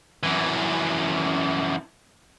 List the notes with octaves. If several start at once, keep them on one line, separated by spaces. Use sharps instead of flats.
F#2 E3